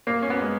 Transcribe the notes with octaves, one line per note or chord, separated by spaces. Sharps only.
A#2 A#3
C#4
B3
G#3